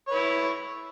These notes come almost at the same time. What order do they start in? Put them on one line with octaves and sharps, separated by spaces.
C#5 B4 E4